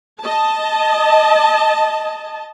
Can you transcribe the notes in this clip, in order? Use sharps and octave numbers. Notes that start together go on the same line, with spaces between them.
D#5 A5